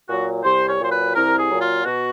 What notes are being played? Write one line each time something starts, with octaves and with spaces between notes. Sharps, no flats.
A#2 F#3 F#4
C2 C5
C#5
A#2 F#3 C5
B4
C2 A#4
G#4
A#2 F#3
F4
B2 F#4